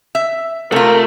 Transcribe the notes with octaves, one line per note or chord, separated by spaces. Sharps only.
E5
C3 A3 F4 A#4